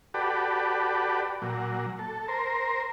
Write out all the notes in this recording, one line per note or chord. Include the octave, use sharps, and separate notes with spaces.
F#4 G4 A4 B4 D5
A#2 F#3
A4
A#4 C5